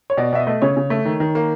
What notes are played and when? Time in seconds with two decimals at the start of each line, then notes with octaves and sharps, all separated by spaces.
0.10 C#5
0.17 B2 D5
0.33 B2 E5
0.39 D#5
0.47 A3
0.62 C#3 C#5
0.77 C#3
0.90 A3
1.05 D#3
1.20 D#3
1.35 A#3